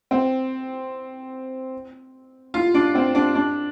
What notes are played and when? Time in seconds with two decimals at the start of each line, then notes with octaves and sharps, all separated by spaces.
0.11 C4
2.54 F4
2.74 D4
2.95 C4
3.15 D4
3.35 D4